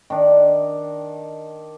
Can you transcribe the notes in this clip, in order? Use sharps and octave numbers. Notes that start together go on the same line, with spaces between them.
D#3 D4